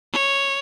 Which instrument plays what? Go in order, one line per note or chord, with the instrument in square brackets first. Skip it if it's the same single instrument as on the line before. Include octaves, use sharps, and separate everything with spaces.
[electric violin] C#5